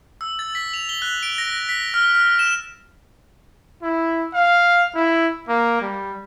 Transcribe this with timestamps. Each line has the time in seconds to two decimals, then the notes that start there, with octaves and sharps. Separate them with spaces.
0.21 E6
0.39 A6
0.55 B6
0.74 F7
0.89 G7
1.02 F#6
1.23 D7
1.38 A#6
1.69 B6
1.94 F6
2.15 F6
2.39 E7
3.82 E4
4.34 F5
4.95 E4
5.48 A#3
5.81 G3